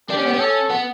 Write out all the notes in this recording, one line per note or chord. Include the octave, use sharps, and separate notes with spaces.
D4 G4
C#4
B3
C#4
A4
B3